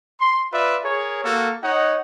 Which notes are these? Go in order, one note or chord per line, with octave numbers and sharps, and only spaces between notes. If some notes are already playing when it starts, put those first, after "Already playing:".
C6
F4 B4 D5 E5
G#4 A#4 C#5
A#3 F#4 A4
D#4 C#5 D#5 F#5